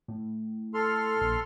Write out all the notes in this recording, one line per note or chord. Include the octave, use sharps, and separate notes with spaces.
A2
A4 C6 F6
A#1